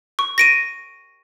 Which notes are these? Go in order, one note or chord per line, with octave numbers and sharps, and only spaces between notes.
C#6
A#6 D7 D#7